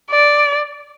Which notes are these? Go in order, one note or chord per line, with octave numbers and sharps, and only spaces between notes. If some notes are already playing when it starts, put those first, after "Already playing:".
D5